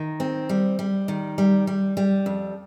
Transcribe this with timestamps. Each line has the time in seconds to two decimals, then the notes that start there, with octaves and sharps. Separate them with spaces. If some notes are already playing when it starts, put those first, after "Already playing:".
Already playing: D#3
0.20 C4
0.49 G3
0.79 G3
1.08 D#3
1.38 G3
1.67 G3
1.97 G3
2.26 F2